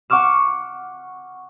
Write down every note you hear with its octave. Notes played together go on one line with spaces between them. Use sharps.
F#5 C#6 D6 F6 E7